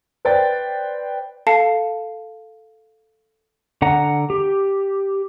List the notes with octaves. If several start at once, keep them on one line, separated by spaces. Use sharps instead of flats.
B4 C5 D5 G5 A6
A4 F5 A5 C7 C#7
D3 F#5 A#5
G4